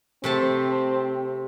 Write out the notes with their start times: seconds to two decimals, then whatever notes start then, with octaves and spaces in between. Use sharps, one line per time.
0.24 C3 A3 C4 A5